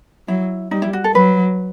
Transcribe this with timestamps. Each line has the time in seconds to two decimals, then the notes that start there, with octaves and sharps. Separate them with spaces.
0.28 F#3 E4
0.71 G3 D#4
0.82 E4
0.93 F#4
1.04 A4
1.14 F#3 B4